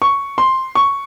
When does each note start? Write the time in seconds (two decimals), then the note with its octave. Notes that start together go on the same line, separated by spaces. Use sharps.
0.02 C#6
0.38 C6
0.75 C#6